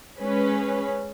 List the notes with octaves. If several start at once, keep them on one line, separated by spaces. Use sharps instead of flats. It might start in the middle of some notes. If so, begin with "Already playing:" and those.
G#3 C#4 G#4 B4